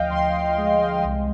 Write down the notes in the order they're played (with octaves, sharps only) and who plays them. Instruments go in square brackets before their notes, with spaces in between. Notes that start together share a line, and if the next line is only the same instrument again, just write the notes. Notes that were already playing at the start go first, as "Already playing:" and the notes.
Already playing: [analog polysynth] D2 F3 D#5 F5 G5
D2 C6
G#3
C2